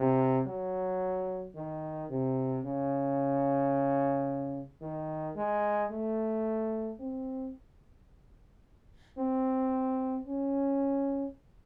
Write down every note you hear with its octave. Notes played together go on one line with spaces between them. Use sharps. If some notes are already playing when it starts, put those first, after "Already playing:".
Already playing: C3
F#3
D#3
C3
C#3
D#3
G#3
A3
C4
C4
C#4